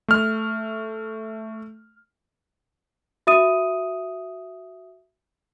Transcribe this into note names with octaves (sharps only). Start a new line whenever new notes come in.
A3 F6
F#4 E5 D#6 D#7